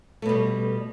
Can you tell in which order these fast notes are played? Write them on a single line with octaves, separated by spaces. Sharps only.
A3 B2 G3